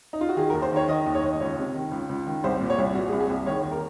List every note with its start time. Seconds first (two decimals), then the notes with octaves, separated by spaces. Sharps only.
0.13 D#4
0.21 F4
0.29 F#4
0.37 D#3 G#4
0.50 A#4
0.54 D#2
0.62 C5
0.72 D#3 C#5
0.88 D#3 D#5
1.06 D#2
1.15 C#5
1.24 D#2
1.32 D#5
1.40 C#2 C#5
1.57 C3
1.74 D#3
1.92 C#2
2.09 C#2
2.27 D#3
2.44 C2 C5
2.60 A#2
2.70 C#5
2.78 C2
2.95 A#2 F#4
3.08 G#4
3.12 C2
3.20 G#4
3.29 C2
3.46 D#3 C#5
3.64 D#2
3.72 A#4